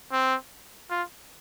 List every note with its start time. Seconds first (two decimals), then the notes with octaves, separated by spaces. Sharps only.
0.12 C4
0.90 F4